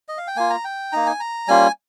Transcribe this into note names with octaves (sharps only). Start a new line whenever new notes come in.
D#5
F5
G5
A#3 F4 G#5
A#5
G5
A#3 D#4 A#5
G#5
A#5
G3 A#3 C#4 F4 G#5